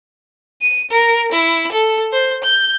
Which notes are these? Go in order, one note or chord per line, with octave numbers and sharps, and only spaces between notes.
D#7
A#4
E4
A4
C5
G6